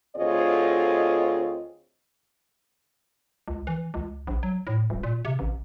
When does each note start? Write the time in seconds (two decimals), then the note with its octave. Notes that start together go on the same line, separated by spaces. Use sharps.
0.17 D2 C4 F4 G#4 C#5 D#5
3.48 C#2
3.67 E3
3.94 C#2
4.27 A#1
4.43 F#3
4.67 A2
4.90 D#1
5.03 A#2
5.25 C3
5.39 A1